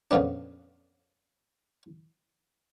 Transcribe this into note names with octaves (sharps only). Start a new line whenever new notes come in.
F2 A#2 C#3 B3 D4